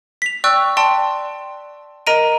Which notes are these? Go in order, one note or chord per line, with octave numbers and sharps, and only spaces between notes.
B6 F7
D5 G5 C#6 E6 F#6
D5 G5 A5 C6
A#4 D#5 A#5 D7 D#7